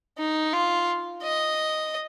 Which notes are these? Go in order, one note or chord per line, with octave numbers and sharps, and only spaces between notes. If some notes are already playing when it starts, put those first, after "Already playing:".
D#4
F4
D#5